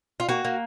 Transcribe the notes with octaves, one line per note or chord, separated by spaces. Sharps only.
F4
A#3 F#4
A#3